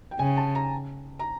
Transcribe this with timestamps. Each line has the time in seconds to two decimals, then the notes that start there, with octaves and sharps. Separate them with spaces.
0.11 G5
0.19 C#3 G#5
0.37 A5
0.55 A#5
1.19 A#5